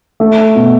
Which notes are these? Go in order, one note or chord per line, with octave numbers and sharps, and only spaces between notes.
A3
B2